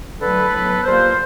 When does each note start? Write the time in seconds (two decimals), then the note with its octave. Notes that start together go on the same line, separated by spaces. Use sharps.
0.21 D3 F#3 A3 A4 B4
0.53 A2 F#3 B3
0.84 A#2 G3 A#3 A#4 C5